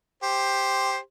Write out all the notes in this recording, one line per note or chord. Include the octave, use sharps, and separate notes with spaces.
G4 C5